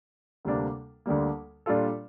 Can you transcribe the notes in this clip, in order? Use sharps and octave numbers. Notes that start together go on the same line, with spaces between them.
D2 C3 G3 A#3 D4
D2 D3 G3 A#3
A#2 G3 D4 F4 A4